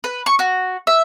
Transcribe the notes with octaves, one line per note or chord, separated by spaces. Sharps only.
B4
C#6
F#4
E5